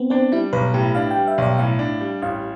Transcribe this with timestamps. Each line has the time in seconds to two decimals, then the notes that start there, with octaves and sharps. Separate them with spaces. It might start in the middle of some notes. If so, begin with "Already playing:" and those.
Already playing: B3 C4
0.10 C4 D4
0.32 G3 E4
0.53 B1 B4
0.74 A2 G4
0.95 D4 F5
1.11 G5
1.17 G3
1.27 E5
1.38 B1 D5
1.58 A2 F5
1.79 D4
2.01 G3
2.22 A1 F5